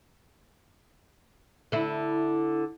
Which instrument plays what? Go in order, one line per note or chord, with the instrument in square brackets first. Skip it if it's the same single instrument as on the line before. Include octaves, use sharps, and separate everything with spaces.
[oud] D3 E4